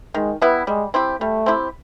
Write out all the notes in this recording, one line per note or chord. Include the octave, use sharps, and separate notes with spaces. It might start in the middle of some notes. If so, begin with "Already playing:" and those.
D#3 G#3
G3 B3 E4
G3 G#3
C4 E4 G4
G3 A3
C4 E4 G4